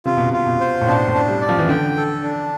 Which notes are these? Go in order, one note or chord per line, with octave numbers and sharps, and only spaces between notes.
C3 F4
B2
C3 F4
B2
C5
A2
B2 D4
A2
D4
G3
D5
F3
E3
D3 G5
A4
D4